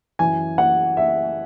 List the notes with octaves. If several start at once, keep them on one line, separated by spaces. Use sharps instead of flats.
F#2 E3 G#5
F#5
E5